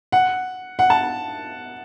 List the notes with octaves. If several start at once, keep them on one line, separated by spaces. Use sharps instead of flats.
F#5
F#5
A5